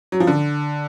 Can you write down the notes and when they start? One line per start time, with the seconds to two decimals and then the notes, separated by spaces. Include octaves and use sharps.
0.12 F#3
0.20 F3
0.27 D3